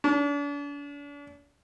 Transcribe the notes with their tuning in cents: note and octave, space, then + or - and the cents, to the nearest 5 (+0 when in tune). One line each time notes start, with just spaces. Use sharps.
D4 -40